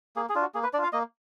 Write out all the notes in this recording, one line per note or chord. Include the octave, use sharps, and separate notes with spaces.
A#3 G#4
G#4
D4 F4
F#4
A#3 G#4
B4
D4 F4 D5 F5
A#3 D#5